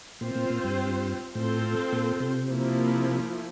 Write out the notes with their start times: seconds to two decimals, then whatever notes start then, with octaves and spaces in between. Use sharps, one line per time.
0.21 A#2 C4 F4 C5
0.35 A#2
0.50 A#2
0.64 G2
1.35 A2 C4 F4 A4 C5
1.92 A#2
2.20 C3
2.49 F3 A#3 E4